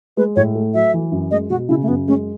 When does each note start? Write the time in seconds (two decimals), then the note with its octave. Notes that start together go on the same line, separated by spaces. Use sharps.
0.17 G#3 B4
0.36 A2 C#5
0.55 A3
0.74 F#3 E5
0.94 E3
1.12 F#2
1.31 G#3 D#5
1.50 B2 F#4
1.69 C#3 E4
1.83 A3
1.88 F#2 B3
2.08 G#3 C#4